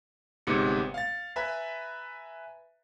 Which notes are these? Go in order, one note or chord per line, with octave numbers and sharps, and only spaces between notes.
G1 G#2 C3 B3 C#7
F5 A6
B4 E5 G#5 A#5 B5